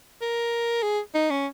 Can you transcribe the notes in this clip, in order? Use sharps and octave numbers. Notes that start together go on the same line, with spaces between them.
A#4
G#4
D#4
C#4